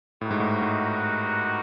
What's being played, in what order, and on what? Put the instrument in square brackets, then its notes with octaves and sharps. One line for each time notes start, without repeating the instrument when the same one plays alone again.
[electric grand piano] A2 [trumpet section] G3 B3 D#4 F#4 A#4
[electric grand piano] G#2
A2
G#2